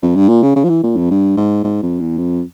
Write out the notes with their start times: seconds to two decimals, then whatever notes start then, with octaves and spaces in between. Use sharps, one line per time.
0.02 F2
0.16 G2
0.29 A#2
0.42 C#3
0.56 C#3
0.64 F3
0.69 E3
0.83 A#2
0.97 F2
1.11 G2
1.37 G#2
1.64 G#2
1.83 F2
2.00 E2
2.18 F2